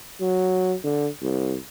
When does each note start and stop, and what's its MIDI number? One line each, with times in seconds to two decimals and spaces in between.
0.21 0.75 54
0.84 1.08 50
1.22 1.57 36